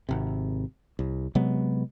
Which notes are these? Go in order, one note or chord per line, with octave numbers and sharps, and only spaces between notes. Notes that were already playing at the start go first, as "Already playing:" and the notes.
G#1 C3
C2
C3 F#3 G#3 B3